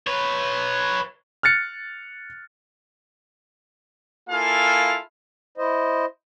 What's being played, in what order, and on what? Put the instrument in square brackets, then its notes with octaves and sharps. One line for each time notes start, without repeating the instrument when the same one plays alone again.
[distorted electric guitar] B4 C#5
[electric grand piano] F6 F#6 A6 C#7
[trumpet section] A#3 E4 F4 A4 F5 G#5
[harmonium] E4 C5 D#5